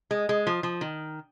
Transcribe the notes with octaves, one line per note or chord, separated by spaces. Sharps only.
G#3
G#3
F3
F3
D#3